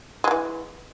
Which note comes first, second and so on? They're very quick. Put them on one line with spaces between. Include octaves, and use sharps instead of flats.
G#3 F#3 E3